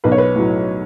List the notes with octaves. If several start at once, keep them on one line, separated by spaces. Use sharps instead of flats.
B1 B4
C#5
B4
A2 F#3